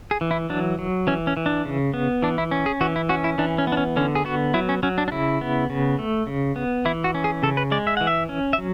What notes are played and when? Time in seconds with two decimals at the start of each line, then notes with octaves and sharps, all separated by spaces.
0.11 G#4
0.21 E3
0.31 E4
0.50 F#3 D4
0.79 F#3
1.07 E3 C#4
1.27 C#4
1.37 E3
1.46 D4
1.65 C#3
1.94 B3
2.22 E3 D4
2.38 E4
2.51 C#4
2.66 G#4
2.81 E3 F#4
2.96 E4
3.09 C#4 F#4
3.24 E4
3.38 E3 D4
3.58 C#4
3.67 B3
3.72 D4
3.77 C#4
3.96 D3 C#4
4.15 G#4
4.25 B3 F#4
4.54 F#3 E4
4.69 C#4
4.83 F#3 C#4
4.98 D4
5.08 D4
5.12 C#3 E4
5.41 B3
5.70 C#3
5.99 A3
6.27 C#3
6.56 B3
6.85 E3 E4
7.04 F#4
7.15 C#4
7.24 G#4
7.43 C#3 A4
7.57 B4
7.71 G#3 D5
7.87 E5
7.97 E3 F#5
8.07 E5
8.29 C#4
8.53 E5
8.58 F#3